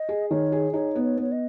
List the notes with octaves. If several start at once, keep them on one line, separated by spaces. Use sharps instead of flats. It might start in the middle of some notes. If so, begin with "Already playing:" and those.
Already playing: D#5
G#4
D#3 C#5
G#4
D#4 C#5
B3
C#5
B3 C#5
D#5